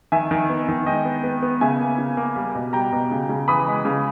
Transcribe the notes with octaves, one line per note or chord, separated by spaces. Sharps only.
D#3 E5 G#5
D#3
B3
D#3
G#3 D#5 G5
B3
B3
B3
C#3 E5 G#5
A#3
C#3
A#3
G3
B2
G3 G5 A#5
B2
C#3
C#3
E3 B5 D#6
G#3
C#3